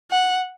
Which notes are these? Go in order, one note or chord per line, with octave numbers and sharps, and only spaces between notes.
F#5